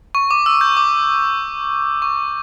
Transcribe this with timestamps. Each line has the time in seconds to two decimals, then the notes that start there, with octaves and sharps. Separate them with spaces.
0.15 C#6
0.31 D6
0.46 E6
0.61 G6
0.77 D6
2.02 C#6